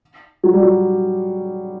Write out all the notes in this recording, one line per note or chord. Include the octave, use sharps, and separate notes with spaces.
F#3
G3
F#3